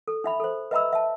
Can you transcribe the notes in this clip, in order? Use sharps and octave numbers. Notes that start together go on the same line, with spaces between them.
A4
D#4 E5 B5
A4 C5
B4 D#5 E5 A#5 B5 E6
E5 A5